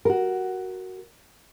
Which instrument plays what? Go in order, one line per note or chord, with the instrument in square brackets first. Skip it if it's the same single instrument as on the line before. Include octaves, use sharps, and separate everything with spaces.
[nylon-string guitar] F#4 A#4